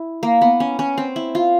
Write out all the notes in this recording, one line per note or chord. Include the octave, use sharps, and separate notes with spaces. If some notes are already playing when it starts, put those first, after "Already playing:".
Already playing: E4
A#3
B3
C#4
C#4
C4
E4
F4